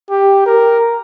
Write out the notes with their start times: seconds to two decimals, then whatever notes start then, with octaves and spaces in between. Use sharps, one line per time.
0.10 G4
0.46 A#4